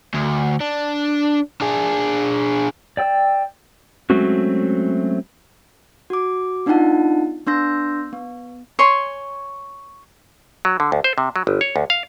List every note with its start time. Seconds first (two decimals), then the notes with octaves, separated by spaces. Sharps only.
0.14 D2
0.60 D4
1.61 D4 G#4
2.97 D5 G5 E6
4.10 F#3 G#3 A3 C4 C#4 F#4
6.10 F#4 D6
6.66 B3 D4 D#4 F4 F#5 A5
7.47 B3 D4 C6 E6 G6 A#6
8.13 B3
8.79 C#5 G#5 C6
10.65 F#3
10.80 D3
10.92 D2
11.04 C5
11.18 C3
11.36 F#3
11.47 G1
11.61 C#5
11.76 D2
11.90 F5